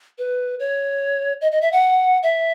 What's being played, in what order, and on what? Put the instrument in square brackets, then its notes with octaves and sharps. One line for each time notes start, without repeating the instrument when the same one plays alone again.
[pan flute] B4
C#5
D#5
D#5
E5
F#5
E5